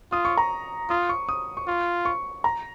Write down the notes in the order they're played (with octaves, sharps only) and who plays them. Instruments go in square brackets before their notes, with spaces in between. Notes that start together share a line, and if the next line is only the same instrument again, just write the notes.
[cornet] F4 [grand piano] D#6
[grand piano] C#6
A#5
[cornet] F4 [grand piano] D#6
[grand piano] C#6
D#6
C#6
[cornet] F4
[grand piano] C#6
A#5